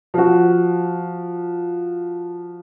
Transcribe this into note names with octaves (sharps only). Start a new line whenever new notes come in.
F3 F#4